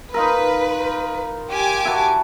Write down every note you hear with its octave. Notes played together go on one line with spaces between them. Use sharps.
D#4 F4 A#4 B4
G4 G#5 D6
E4 F#4 A5